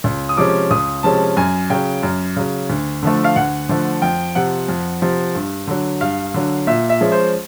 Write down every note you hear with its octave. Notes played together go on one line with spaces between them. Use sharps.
C#2
D#6
C3 F3 G#3 C#4 D6
C#2 D#6
C3 F3 G#3 C#4 A5
F#2 G#5
C#3 F#3 G5
F#2
C#3 F#3
D2
D3 F3 A3
F5
D2 F#5
D3 F3 A3
F2 G5
C3 F3 F#5
F2
C3 F3
G2
D3 F#3
G2 F5
D3 F#3
A#2 E5
E5
F3 G#3 C#4
C5